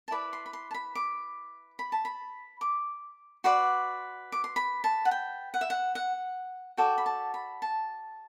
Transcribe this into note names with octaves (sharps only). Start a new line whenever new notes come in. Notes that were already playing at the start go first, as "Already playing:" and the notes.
A5
E4 B4 D5 B5
C6
B5
C6
A5
B5
D6
B5
A5
B5
D6
F#4 B4 D5 C6
D6
C6
B5
A5
F#5
G5
F#5
E5
F#5
F#5
F#4 A4 D5 G5
B5
A5
B5
A5